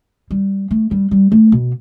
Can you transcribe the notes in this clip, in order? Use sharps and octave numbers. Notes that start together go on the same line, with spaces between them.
G3
A3
G3
G3
A3
B2